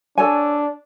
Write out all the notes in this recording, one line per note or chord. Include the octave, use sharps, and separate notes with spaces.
D4 A4 C#5 G#5